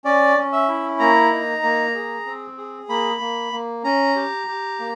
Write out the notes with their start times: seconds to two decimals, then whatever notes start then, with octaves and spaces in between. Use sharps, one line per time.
0.05 C#4 D5
0.37 C#4
0.52 E5
0.68 E4
0.99 A#3 A#5
1.31 D#4
1.63 A#3
1.95 G#4
2.26 C4
2.58 G#4
2.89 A#3 B5
3.21 A#3
3.53 A#3
3.84 C#4 A#5
4.16 G4
4.47 G4
4.79 A#3